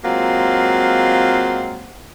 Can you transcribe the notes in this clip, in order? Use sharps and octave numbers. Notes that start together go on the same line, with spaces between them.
F#3 G#3 A#3 C4 F4